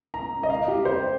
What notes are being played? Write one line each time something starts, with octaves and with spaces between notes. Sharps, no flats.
A#5
D#5
F5
G4
C5